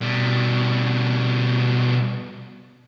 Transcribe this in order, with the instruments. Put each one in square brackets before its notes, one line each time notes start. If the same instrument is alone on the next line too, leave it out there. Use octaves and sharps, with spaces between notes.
[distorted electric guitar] B2 G3